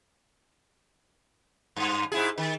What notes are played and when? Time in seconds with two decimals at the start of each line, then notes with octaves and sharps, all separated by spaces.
1.76 G2
2.12 G#2 E4 G#4
2.38 D#3